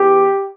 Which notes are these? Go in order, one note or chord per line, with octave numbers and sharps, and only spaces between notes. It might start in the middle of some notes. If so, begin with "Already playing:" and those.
Already playing: E2 E3 G4